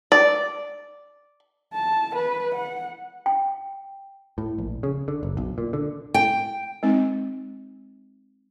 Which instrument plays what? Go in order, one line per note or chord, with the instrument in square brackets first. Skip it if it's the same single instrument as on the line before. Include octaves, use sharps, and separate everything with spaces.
[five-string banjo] D5
[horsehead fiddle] A5
B4
F#5
[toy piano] G5
[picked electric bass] A2
A#1
C#3
D3
F#1
B1
A#2
D3
[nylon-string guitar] G5
[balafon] G#3 C4 D#4